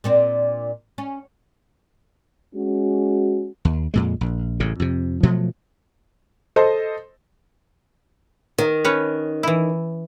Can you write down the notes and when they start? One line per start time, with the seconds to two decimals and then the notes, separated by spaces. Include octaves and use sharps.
0.04 A#2 C4 D4
0.98 C#4
2.55 G#3 C#4 F#4
3.65 D#2
3.94 F2 A#2 G#3
4.21 A#1
4.60 A1 A2 C#3
4.80 F2 C3
5.23 B2 F3 F#3 A3
6.56 A4 C5 D#5
8.58 D#3
8.85 C#4 B4 C#5
9.43 E3 E4